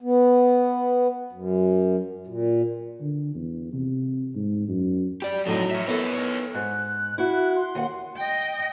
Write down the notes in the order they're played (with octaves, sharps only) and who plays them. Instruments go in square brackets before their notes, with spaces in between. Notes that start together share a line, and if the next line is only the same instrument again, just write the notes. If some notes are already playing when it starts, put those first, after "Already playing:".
[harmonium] B3
F#2
A#2
[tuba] D3
E2
C3
G#2
F#2
[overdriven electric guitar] G4 D5
[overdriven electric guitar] F2 D#4 [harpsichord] A2 F#3
[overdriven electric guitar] F#4 E5
[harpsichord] B3 E4 A4 [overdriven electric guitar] A#4 C#5
[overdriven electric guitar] D#4 C#5
[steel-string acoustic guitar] G#2 [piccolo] F#6
[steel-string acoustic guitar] E4 F#4
[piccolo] C6
[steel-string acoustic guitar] D#2 F#5
[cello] D#5 G5